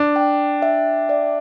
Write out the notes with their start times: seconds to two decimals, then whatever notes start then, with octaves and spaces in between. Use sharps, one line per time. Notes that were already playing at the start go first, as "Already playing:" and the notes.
Already playing: D4
0.16 G5
0.62 E5
1.09 D5